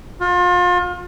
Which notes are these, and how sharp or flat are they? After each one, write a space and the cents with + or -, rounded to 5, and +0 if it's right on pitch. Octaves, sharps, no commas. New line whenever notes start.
F4 +35